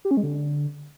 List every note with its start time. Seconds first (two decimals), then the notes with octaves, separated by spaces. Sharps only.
0.05 G4
0.11 C#4
0.17 G#3
0.23 D3